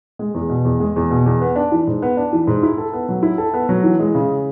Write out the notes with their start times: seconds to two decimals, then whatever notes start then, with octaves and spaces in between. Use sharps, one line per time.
0.19 G#3
0.34 E2
0.49 B2
0.65 E2
0.80 G#3
0.96 E2
1.11 B2
1.26 E2
1.42 B3
1.56 D4
1.72 E3
1.87 G#2
2.02 B3
2.17 D4
2.33 E3
2.47 G#2
2.63 E4
2.78 A4
2.93 B3
3.09 F#3
3.23 E4
3.38 A4
3.54 B3
3.69 F#3
3.84 E3
4.00 G#3
4.15 C#3